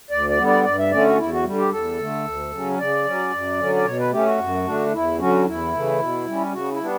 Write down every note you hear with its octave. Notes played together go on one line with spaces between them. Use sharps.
D2 D5
D5
D3 G3 B3
D5
G2 D5
E5
D3 A3 C#4 D5
F#4
E2 E4
F#4
D3 G3
G4
E2 A4
D3 A3
D2
C#3 F#3 C#4
C#3 D5
F#3 C#4
F#2
D3 F#3 C#4
D5
B2 C#5
B4
A3 C#4 G4
F#4
F#2
D3 A3 D4
E2 E4
D3 F#3 C#4 F#4
E2 E4
C#3 E3 A3
B2
G3 C#4
C#3 F#4
E4
G3 B3 D4